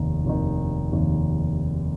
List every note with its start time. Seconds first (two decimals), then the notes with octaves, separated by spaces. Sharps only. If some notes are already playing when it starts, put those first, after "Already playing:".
Already playing: F1 D#2 D#3
0.24 F1 D#2 D#3
0.92 F1 D#2 D#3